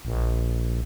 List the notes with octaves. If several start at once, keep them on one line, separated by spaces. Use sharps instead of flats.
A#1